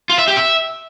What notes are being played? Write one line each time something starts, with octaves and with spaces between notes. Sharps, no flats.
F4
E5
G4
E5